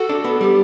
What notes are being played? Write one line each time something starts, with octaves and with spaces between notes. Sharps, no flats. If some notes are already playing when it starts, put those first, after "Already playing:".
Already playing: F#4 A4
D4
B3
G3 G4